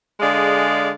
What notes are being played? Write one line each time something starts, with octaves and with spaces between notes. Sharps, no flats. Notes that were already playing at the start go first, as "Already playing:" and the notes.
D3 G#3 G#4 D5 D#5 F5